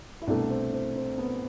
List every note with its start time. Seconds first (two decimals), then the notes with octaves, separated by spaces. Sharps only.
0.22 E4
0.27 C2 B2 A3 D4
0.50 C4
0.73 C4
0.96 C4
1.18 B3